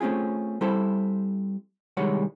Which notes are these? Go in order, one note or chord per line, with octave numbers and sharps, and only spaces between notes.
A3 C4 C#4 F4 G#4
G3 C4 E4 A4 C5
C2 D#3 G3 G#3 C#5 F#5